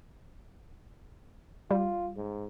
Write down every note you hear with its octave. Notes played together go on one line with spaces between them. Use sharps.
G3 F4
G#2